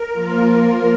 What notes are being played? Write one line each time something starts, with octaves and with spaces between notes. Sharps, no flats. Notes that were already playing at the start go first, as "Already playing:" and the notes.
Already playing: A#4
F3 A#3 F4